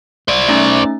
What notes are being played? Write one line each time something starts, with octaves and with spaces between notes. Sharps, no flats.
C5 D5
A3 C#4 D#4